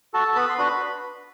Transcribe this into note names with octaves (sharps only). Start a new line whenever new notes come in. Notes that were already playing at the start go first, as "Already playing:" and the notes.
F#4 A4 A5
B3 B4 B5
C6
D4 F#4 B4 B5